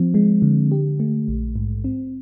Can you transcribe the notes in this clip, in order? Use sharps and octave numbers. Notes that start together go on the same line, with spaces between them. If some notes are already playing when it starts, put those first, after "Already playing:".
Already playing: F3 C4
G#3
D3
G4
A3
A#1
G#2
C4